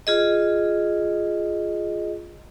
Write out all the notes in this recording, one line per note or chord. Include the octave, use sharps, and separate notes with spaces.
F4 G#4 D#5